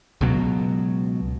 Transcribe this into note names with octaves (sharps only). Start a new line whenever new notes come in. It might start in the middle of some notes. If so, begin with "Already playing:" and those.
C#2 B2 F#3